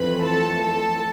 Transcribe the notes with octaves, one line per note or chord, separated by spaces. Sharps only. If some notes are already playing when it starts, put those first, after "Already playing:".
Already playing: F2 E3 A3 C4 B4 B5
A4 A5
A4 A5